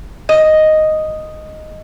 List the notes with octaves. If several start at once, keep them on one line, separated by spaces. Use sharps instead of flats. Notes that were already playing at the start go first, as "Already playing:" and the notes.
D#5